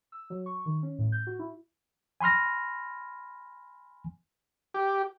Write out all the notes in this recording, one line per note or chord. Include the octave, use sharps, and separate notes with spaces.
E6
F#3
C#6
D#3
C#4
A2
G6
F#4
E4
G#5 B5 C6 F6 A#6
G4